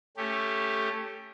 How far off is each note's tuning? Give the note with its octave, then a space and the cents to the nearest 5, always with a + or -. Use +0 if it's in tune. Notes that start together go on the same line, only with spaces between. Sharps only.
A3 +5 C#4 +0 G4 +10